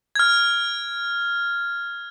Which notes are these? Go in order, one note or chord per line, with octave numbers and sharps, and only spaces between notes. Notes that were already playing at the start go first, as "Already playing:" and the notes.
F6 G#6